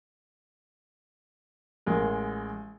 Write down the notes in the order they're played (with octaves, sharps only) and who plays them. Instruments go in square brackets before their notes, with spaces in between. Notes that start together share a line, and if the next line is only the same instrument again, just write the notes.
[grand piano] A1 G#3 A#4